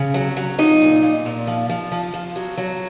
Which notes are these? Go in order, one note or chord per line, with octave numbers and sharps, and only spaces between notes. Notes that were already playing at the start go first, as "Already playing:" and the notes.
Already playing: C#3
F#3
F#3
F3 D#4 D#5
A#2
A#2
A#2
F3
F3
F3
F3
F#3
F#3